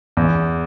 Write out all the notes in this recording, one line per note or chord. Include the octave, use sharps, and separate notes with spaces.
E2